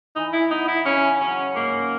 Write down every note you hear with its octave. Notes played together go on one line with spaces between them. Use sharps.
E3 D#4
E4
B3 D#4
E4
C#3 C#4
F#3 C#4
G#2 A#3